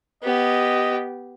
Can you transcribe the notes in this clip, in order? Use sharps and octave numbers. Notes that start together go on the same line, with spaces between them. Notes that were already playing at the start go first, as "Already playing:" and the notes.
B3 G4 D#5